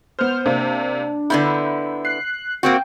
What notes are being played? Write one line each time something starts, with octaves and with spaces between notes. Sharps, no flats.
B3 C5 F6
C3 A#3 D4
D3 B3 E4 B5 G6
F#6 C7
A#3 C4 F#4 G5